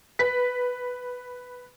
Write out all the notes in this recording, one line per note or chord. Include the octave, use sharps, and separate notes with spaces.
B4 B6